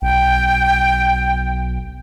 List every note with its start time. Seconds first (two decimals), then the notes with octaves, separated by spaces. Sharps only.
0.02 B1 G5